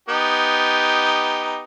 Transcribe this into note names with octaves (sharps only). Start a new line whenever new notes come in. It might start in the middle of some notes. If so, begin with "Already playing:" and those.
B3 D#4 G4